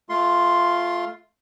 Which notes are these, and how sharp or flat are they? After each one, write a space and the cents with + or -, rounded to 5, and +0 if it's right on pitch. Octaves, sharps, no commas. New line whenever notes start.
A3 -20 F4 +0 C6 +0